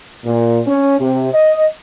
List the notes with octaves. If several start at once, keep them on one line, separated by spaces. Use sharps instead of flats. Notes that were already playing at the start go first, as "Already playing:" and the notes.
A#2
C#4
C3
D#5